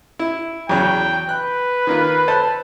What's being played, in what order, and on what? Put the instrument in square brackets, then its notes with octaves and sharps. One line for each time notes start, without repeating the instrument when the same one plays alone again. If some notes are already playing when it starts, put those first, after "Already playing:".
[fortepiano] E4
[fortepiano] E2 C#3 F#3 [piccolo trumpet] G5
[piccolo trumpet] B4 [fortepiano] F#6
[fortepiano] D#3 A#3 F4
A4 C5 A5